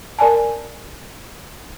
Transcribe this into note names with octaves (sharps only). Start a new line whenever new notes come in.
A#4 D5 G#5 A5